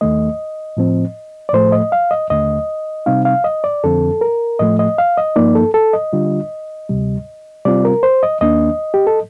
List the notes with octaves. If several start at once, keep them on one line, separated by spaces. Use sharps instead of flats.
D#2 D#3 A3 D#5
A2 F3 C4
D5
A2 F3 A3 C5
D#5
F5
D#5
D#2 D3 A3 D#5
C3 G3 C4 D#4 F5
F5
D#5
D5
F2 D3 F3 C4 A4
A#4
A2 F3 A3 D#5
D#5
F5
D#5
G2 F3 A#3 D#4 D5
A4
A4
D#5
D3 G3 D4 F4
D2 C3 G3
C3 G3 C4 F4 D5
A#4
C5
D#5
D#2 D#3 A#3 D4 D#5
G4
A4